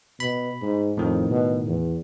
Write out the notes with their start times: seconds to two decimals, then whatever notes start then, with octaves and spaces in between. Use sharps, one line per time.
0.20 B2 B5
0.62 G#2
0.97 F2 A2 D#3
1.29 B2
1.67 E2